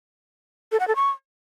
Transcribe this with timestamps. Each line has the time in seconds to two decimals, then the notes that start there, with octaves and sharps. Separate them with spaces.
0.72 A4
0.80 F#5
0.88 A4
0.96 C#6